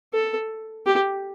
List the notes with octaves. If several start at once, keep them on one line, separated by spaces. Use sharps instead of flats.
A4
G4